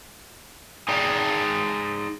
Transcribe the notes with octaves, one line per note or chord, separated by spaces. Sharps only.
D#4 G#4 D5 G5